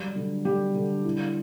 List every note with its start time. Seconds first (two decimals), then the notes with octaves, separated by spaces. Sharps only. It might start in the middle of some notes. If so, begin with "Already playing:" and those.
Already playing: F#3 G3
0.16 D3
0.45 G3 G4
0.75 D3
1.04 E4